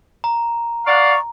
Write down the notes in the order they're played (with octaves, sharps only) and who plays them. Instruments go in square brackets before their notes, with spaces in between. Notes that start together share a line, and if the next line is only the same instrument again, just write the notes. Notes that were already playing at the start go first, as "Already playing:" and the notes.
[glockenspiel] A#5
[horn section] D5 F5 F#5 [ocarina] C#6